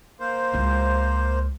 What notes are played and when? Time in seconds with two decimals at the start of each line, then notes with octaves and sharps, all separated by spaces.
0.20 A#3 C5
0.54 C#2 E4